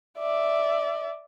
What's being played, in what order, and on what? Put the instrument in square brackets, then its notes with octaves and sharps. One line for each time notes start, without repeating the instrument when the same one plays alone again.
[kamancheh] D5 E5